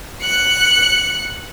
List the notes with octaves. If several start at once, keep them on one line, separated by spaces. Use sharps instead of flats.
F#6 C#7